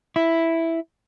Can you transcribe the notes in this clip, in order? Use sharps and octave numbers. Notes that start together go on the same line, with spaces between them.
E4